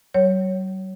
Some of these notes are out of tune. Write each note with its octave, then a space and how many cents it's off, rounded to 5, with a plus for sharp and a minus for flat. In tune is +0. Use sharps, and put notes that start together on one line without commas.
F#3 +45 C#5 +0